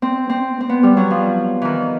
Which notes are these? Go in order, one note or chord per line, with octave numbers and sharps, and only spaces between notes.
C4
C4
C4
B3
G3
F#3
F3
D#3 E3